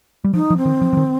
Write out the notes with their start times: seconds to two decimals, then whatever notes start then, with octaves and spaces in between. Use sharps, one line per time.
0.24 G3
0.34 F3 D#4
0.50 F3
0.57 C4
0.65 D#3
0.81 F3
0.93 F3
0.97 D#3